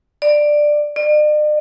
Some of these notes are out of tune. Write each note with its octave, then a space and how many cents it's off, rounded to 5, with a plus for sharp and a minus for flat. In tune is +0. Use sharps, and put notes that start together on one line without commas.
D5 +10
D5 +45